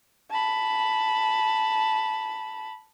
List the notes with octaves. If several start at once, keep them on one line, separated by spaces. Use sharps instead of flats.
A5 B5